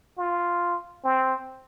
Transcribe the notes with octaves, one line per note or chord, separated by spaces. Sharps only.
F4
C4